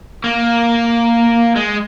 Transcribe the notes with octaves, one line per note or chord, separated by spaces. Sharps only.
A#3
G#3